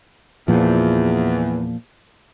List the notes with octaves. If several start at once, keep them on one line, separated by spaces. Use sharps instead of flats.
E2 A#2 F3